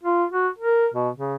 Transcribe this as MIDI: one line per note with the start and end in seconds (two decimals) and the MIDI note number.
0.04 0.25 65
0.31 0.48 66
0.58 0.88 70
0.94 1.09 47
1.17 1.36 49